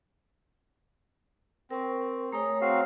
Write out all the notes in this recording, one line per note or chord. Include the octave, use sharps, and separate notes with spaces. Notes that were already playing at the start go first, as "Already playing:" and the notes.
C4 A#4 C#6
A3 G#4 C#5 A#5
C4 F#4 F5